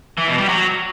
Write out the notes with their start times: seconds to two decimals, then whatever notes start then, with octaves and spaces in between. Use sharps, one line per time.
0.18 E3
0.28 B2
0.38 G3
0.49 F#3